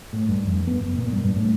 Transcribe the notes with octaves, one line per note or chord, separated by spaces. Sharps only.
A2
G2
F2
B3
F#1
A#2
G2
G2
A2